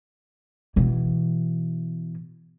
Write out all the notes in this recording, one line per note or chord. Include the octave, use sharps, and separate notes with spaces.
B2 E3